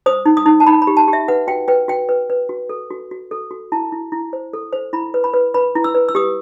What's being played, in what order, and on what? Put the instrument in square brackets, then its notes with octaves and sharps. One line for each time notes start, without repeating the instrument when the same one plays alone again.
[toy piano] C5 D#6
D#4
D#6
D#4
A5
D#4 B5
B5
G4
A5
G4
E5
B4 F#5
F#4 G5
B4 G5
F#4 G5
B4
B4
F#4
A4
F#4
F#4
A4
F#4
E4 A5
E4
E4
C5
A4
C5
E4 B5
B4
B5
B4
B4 B5
E4
E6
B4
E6
G4 D#6